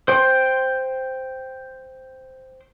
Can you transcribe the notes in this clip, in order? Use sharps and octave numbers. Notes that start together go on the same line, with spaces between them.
C5 G5 C6